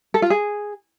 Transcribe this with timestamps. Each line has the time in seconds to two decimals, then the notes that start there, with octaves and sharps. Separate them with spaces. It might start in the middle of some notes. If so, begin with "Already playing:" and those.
0.14 A4
0.22 F4
0.30 G#4